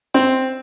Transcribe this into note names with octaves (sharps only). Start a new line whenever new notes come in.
C4